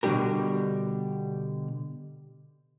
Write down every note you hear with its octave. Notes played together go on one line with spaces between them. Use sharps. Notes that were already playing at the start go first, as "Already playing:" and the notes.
B2 D3 G3 D4 G4 A#4